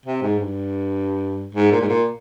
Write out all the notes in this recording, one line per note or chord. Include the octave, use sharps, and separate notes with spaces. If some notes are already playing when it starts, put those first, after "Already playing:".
C3
G#2
G2
G#2
A#2
G#2
A#2